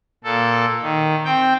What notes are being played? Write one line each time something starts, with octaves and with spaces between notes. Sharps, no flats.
A#2 A4
D#3
C4 G5